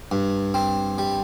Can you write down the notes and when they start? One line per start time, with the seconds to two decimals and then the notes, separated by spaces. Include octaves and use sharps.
0.12 G2
0.54 C4
0.98 G3